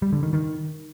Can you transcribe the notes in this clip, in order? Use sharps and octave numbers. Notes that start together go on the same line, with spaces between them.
G3
D3
D#3
D#3